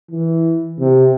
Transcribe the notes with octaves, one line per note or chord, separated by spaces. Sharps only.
E3
C3